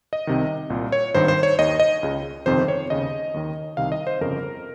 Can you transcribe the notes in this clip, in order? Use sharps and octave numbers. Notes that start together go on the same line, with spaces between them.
D#5
C2 C3 D#3
C2 A#2
C#5
G#1 G2 D#3 C5
C5
C#5
D#2 D#3 D#5
D#5
C#2 C#3
G1 F2 C3 D#3 C5
C#5
D#2 C#3 D#5
D#2 D#3
C2 C3 D#3 F5
D#5
C5
G1 F2 C#3 A#4